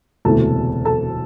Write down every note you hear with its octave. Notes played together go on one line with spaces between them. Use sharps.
E1 D2 C3 E3 A3 A4 A5
A4 A5